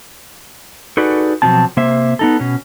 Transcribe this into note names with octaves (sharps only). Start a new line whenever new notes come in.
D#4 F#4 G#4 A4 B4 D5
B2 F3 F#3 C4 A5
C3 A#3 C5 E5
B3 D#4 A4
B2 C#4